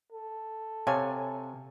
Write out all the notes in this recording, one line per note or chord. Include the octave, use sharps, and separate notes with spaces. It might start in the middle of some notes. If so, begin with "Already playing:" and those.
A4
C3 C#5 F5 G#5 A5